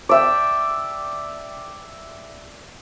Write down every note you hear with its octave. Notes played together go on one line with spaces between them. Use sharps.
D5 E5 G5